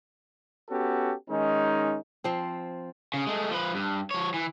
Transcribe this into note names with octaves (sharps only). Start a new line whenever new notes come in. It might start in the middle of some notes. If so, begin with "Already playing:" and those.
B3 C#4 F#4 G4 A4
D#3 G#3 C#4 D#4
F3 C4
C#3
G#3 A3
F3 B4
G2
F3 C#5
E3